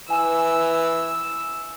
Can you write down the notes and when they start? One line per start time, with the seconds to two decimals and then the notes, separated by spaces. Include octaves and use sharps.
0.10 E3 G#5 E6